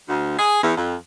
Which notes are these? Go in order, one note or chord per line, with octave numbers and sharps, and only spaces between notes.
D2
G#4
E2
F2